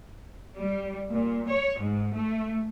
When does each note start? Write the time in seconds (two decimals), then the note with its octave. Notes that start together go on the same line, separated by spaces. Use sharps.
0.56 G3
1.11 A#2
1.48 C#5
1.80 G#2
2.15 A3